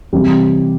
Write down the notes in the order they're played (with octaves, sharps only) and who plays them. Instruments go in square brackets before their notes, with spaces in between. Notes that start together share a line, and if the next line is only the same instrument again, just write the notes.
[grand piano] C3 E3 G3